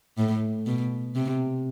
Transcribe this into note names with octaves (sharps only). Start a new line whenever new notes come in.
A2
B2
C3